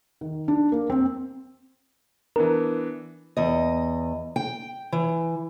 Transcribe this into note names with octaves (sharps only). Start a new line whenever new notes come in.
D#3
D4
A#3
C4
E3 B3 D4 A#4
E2 D#5
G5
E3